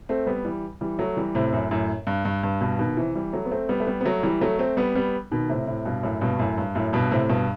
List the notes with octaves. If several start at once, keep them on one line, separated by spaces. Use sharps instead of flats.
A3 C4
G3 B3
E3 G3
E3 G3
F#3 A3
E3 G3
A2 C3
F#2 A2
F#2 A2
G2
G2
G2
G2 B2
B2 D#3
C3 E3
E3 G3
F#3 A3
B3
A3 C4
G3 B3
A3
G3 B3
B3
F#3 A3
E3 G3
F#3 A3
A3 C4
G3 B3
G3 B3
B2 D#3
A2 C3
A2 C3
G2 B2
F#2 A2
G2 B2
G2
F#2 A2
G2
F#2 A2
G2 B2
A2 C3
G2 B2